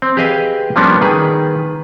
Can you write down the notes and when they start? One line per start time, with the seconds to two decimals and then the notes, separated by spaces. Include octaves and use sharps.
0.02 C4
0.17 G4 G#4 B4 D#5 F5 G#5
0.76 F3 G3 A#3 B3 C#4 D4
1.01 D#3 G#4 B4